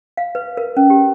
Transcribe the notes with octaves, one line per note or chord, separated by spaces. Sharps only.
F5
B4
A#4
C#4
G4